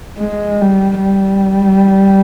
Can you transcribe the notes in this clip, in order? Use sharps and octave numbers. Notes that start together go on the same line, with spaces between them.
G#3
G3
G3